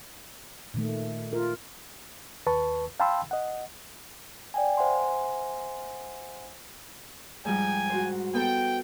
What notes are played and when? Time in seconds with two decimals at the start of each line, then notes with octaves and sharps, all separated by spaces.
0.74 A#2 D#3 A3
1.33 F4 A#4
2.46 D#2 B4 A5 C#6
3.00 F5 G5 A5 B5 C6 E6
3.31 D#5 F#5
4.54 D5 G5 G#5
4.77 C5 E5 F#5 G#5 C6
7.45 G#2 F3 G3 G5 G#5
7.90 F#4 C5
8.34 B3 A4 G5